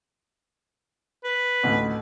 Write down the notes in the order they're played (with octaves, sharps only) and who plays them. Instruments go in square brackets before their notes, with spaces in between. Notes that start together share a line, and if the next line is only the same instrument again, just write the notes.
[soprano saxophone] B4
[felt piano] A1 D2